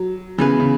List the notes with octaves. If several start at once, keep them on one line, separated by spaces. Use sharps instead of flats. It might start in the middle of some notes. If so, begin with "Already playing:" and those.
Already playing: F#3
C#3 E3 B3 G#4 B4
C#3